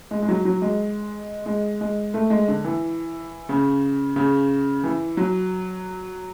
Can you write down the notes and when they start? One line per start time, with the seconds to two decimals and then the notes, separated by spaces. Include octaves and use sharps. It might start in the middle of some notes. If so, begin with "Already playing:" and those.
0.11 G#3
0.22 G#3
0.28 F#3
0.45 F#3
0.62 G#3
1.46 G#3
1.81 G#3
2.14 A3
2.30 G#3
2.48 D3
2.65 E3
3.49 C#3
4.16 C#3
4.84 E3
5.17 F#3